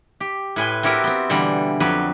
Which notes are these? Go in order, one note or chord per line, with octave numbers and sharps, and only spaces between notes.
G4
A2 B4 G#5 C6
C4 E4 F#4 G4 A#4 B4
B3 C4
B2 D3 E3 G3
F2 F#3 G4 B4